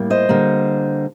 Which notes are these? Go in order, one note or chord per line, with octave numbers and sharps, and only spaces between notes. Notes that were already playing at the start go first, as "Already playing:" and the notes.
Already playing: A2 G3 A#3
C5 D#5
D3 G3 A#3